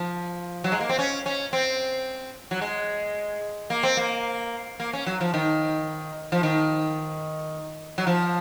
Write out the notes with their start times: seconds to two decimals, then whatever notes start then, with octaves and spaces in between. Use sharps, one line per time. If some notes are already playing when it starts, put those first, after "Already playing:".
Already playing: F3
0.64 F#3
0.72 G#3
0.80 A#3
0.89 C4
0.98 C#4
1.26 C#4
1.53 C4
2.51 F#3
2.61 G#3
3.70 A#3
3.83 C4
3.97 A#3
4.80 A#3
4.93 C#4
5.06 F#3
5.21 F3
5.34 D#3
6.32 F3
6.43 D#3
7.98 F#3
8.07 F3